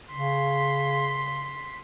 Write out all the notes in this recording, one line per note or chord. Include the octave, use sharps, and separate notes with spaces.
C#3 C6 B6